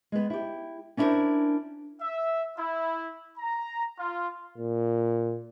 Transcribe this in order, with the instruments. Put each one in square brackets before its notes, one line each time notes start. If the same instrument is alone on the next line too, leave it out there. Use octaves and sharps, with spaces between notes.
[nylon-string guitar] G#3 B3
E4 G4
C#4 D4 E4 G4 A#4 C5
[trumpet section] E5
E4
A#5
F4
[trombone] A#2